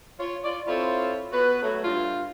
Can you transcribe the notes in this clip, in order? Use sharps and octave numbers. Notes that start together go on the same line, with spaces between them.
F4 C#5
F4 C#5 D5
C4 E4 F4 A4 C#5
B3 F#4 B4
F#3 A3
G2 F4